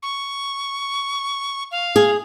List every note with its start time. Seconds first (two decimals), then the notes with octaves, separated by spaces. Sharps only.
0.03 C#6
1.71 F5
1.96 G#4